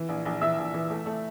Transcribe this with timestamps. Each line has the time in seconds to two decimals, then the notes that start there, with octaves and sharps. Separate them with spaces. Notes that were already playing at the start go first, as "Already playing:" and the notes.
Already playing: E3
0.09 A#1
0.25 A#1
0.41 E3 E5 E6
0.58 A#1
0.74 E3
0.90 A3
1.06 A3